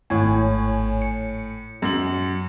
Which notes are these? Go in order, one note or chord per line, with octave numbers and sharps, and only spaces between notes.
G#1 A2 C#5 G#5
C#7
F#2 F#7